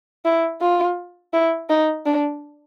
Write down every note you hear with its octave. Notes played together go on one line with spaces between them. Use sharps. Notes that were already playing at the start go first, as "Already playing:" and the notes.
E4
F4
E4
D#4
D4